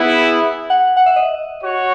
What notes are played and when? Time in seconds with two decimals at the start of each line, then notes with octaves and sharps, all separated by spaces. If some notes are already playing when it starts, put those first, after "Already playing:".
Already playing: B3 E4 G#4
0.70 F#5
0.97 F#5
1.06 E5
1.16 D#5
1.63 F#4 C#5